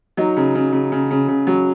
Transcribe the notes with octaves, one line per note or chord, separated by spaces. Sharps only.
F#3 D#4
C#3
C#3
C#3
C#3
C#3
C#3
F#3